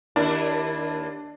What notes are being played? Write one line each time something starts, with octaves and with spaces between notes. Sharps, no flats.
D#2 D4 E4 A#4